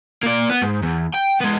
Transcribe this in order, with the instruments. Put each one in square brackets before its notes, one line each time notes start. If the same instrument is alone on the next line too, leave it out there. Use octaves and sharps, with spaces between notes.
[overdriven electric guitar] A#3 D5
B3
G#2
E2
G5
G#3 B3